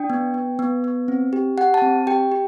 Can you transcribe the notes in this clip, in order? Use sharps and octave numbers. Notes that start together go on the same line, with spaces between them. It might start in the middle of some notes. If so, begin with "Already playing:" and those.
Already playing: D4 G5
B3
B3
B3
B3
C4
G4
G4 F#5
A5
C4
G4 G5
G4